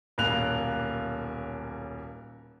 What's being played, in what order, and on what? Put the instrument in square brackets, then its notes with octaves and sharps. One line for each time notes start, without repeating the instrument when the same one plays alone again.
[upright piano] D#1 B1 A#3 F#6 F7